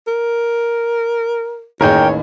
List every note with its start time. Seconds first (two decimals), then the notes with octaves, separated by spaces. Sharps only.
0.08 A#4
1.81 A1 D#2 G#4 A#4 C#5 G5